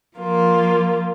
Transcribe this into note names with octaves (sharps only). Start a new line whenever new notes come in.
F3 A#3 F4